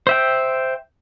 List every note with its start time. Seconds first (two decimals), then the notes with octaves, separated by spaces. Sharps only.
0.07 C5 E5 G5